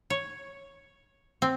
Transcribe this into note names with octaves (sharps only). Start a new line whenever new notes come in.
C#5
C4